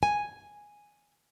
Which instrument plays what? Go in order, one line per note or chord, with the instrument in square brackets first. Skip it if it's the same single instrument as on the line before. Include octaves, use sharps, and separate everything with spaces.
[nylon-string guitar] G#5